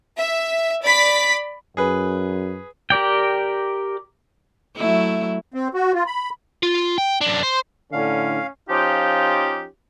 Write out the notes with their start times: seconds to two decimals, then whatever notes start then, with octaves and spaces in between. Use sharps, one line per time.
0.18 E5
0.85 D5 B5 B6
1.77 F#2 G#4 B4
2.90 G4 A#4 D5 G5
4.76 F#3 A3 E4
5.54 C4
5.74 F#4
5.94 F4
6.06 B5
6.63 F4
6.98 G5
7.21 F#2 D4
7.43 C5
7.92 A2 D3 C#4 F5
8.69 F3 C#4 D#4 F4 G4